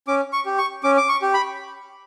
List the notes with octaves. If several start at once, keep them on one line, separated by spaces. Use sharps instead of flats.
C#4 D6
C#6
G4
C#6
C#4 D6
D6
C#6
G4
B5